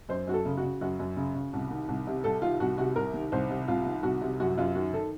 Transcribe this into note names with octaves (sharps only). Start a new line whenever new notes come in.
F#2 C5
F#2 F#4
A4
C#3
F#4
C#3
F#2 F#4
F#2
C#3
C#3
C2
D#3
C2
C3
C2 A4
D#3 F4
C2 F#4
C3 F#4
C2 A#4
D#3
C2 C5
C3
C2 F4
D#3
C2 F#4
C3
F#2 F#4
F#2 F4
D#3 F#4
D#3 A4